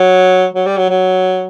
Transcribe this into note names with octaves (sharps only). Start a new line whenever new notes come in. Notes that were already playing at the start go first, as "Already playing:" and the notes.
Already playing: F#3
F#3
G3
F#3
F#3